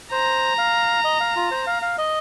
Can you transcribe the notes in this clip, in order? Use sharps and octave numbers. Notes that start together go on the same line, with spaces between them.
C5 A#5
F5
D#5
F5
F4
C5
F5
F5
D#5